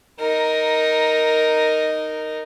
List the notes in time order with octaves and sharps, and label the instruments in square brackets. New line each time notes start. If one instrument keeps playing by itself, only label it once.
[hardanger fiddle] D#4 A#4